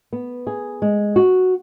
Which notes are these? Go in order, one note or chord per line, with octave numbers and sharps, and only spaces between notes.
B3
G#4
G#3
F#4